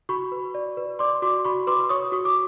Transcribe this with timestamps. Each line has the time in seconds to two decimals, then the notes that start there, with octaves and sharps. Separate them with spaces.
0.09 F#4 B5 C#6
0.32 B4
0.54 D5
0.77 B4
0.99 D5 C6 D6
1.22 F#4 C6 D6
1.45 F#4 B5 C#6
1.67 B4 C6 D6
1.89 C#5 C#6 D#6
2.12 F#4 C#6 D#6
2.25 D6